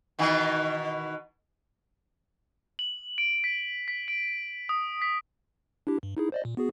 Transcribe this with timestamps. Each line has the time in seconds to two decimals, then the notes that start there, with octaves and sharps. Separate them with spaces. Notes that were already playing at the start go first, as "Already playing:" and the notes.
0.19 B2 D#3 E3
2.79 F#7
3.18 D7
3.44 B6
3.88 B6
4.08 D7
4.69 D#6
5.02 B6
5.87 D4 E4 G4
6.03 G2
6.17 D#4 E4 G#4
6.32 C5 D5 D#5
6.45 A#2
6.57 B3 F#4 G#4